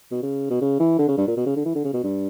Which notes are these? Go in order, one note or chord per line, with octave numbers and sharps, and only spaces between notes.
B2
C#3
B2
C#3
E3
D3
C#3
G2
A#2
B2
C#3
D3
E3
D3
C#3
B2
G2